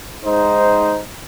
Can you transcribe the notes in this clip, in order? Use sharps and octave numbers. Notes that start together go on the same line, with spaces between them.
G#2 D#4 C5